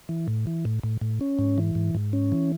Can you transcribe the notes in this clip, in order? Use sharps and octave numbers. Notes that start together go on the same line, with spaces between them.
E3
A2
E3
A2
A2
A2
C#4
G#2
E3
G#2
G#2
C#4
E3